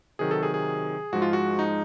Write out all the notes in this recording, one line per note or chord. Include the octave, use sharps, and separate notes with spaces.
C3 D#3 F#3 G#4
A4
G#4
G#4
G#2 F3 G#3 F#4
F4
F#4
D#4